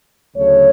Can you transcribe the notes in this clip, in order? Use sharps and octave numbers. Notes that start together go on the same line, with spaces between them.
D2 C#3 F#3 A3 C#5